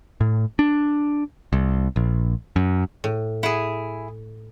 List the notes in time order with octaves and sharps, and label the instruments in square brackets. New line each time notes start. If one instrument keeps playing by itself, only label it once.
[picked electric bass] A2
D4
C2
A#1
F#2
[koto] A2
[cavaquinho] E4 G#4 [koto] F#5